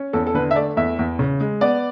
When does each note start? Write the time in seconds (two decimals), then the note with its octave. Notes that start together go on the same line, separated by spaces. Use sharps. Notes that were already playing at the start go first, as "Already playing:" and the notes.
Already playing: C#4
0.13 E2 A4
0.27 A4
0.34 D3 B4
0.51 E5
0.55 A3 D5
0.77 E2 E5
0.99 E2
1.19 C#3
1.40 G#3
1.61 B3 D5